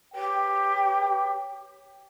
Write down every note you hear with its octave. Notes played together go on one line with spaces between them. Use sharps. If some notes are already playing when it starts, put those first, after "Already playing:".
G4 B4 C#5 G5